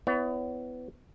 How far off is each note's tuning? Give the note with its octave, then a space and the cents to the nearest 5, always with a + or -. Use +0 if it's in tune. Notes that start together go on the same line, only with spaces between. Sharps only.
B3 +25 E4 +5 C#5 +35